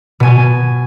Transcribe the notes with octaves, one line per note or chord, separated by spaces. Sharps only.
B2 G#5